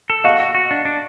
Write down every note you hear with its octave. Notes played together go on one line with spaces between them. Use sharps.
A4
F#4 D#5 F5
F#4
F#4
D4
D4